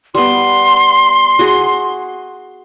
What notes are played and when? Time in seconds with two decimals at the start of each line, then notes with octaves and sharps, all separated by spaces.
0.15 G3 B3 C6
1.39 F#4 G#4